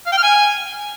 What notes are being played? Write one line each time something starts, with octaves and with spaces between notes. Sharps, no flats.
F5
G5
F6
G#5